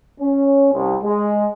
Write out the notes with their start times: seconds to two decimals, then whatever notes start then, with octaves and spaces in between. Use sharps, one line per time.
0.20 C#4
0.74 C2
1.04 G#3